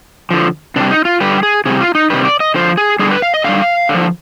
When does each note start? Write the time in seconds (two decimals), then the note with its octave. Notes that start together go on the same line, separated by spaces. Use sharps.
0.31 D3 F3
0.76 C3 G3 D4
0.91 D#4
1.05 F4
1.21 D3 G3 B4
1.38 G4
1.43 G#4
1.65 C3 G3 G#4
1.81 F4
1.95 D#4
2.10 C3 D#3 G3 B4
2.25 D5
2.40 D#5
2.54 D3 F3 C5
2.77 G#4
2.99 D3 G3 G#4
3.11 B4
3.22 F5
3.34 D#5
3.44 D3 G3 F5
3.89 D3
3.94 F3